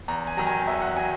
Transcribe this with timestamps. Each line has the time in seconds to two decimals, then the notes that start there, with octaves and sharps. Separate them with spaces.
0.08 E2 A#5
0.27 G#5
0.37 D#3 F#3 A#5
0.47 G#5
0.67 E2 E5
0.82 F#5
0.96 D#3 F#3 G#5